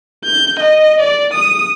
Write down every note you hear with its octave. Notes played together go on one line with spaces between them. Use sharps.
G6
D#5
D5
D#6